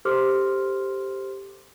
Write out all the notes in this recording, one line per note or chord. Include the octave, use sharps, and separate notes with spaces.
G4 A4 C5 C6 D6 F6